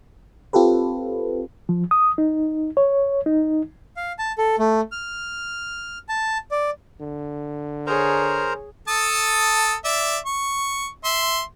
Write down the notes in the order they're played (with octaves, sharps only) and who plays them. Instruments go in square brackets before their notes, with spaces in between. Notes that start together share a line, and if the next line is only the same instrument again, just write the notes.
[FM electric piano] C4 F4 G4 A4 B4
[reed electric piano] F3
D#6
D#4
C#5
D#4
[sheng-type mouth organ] F5
A5
A4
A3
F6
A5
D5
[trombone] D3
[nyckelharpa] G#4 C#5 [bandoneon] A#4 C5 A#5
[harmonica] A4 A5 D#6
D5 E5
C#6
E5 C6